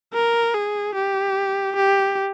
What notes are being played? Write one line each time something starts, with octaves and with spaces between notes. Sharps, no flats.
A#4
G#4
G4
G4